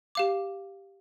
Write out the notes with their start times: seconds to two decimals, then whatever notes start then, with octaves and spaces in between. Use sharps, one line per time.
0.15 G4 F5 D6